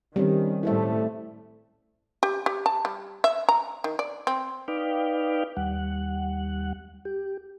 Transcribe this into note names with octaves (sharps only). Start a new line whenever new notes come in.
D#3 G3 C4 C#4
A2 G3 A3 E4 C5 E5
G4
G4
A5
G3
E5
A#5
D#3
D5
C4
D#4 B4 D5 F5 G5
D#2 G3 F#5
G4